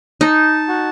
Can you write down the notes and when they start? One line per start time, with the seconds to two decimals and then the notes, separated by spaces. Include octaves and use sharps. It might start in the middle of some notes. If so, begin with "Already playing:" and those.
0.21 D#4 A5
0.68 F#4